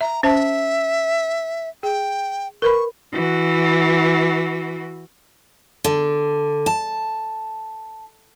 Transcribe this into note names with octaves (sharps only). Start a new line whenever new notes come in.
E5 A#5
C#4 C5 E5 A5
G#4 G5
A#4 B4 B5 C#6
E3 F#4
D3
A5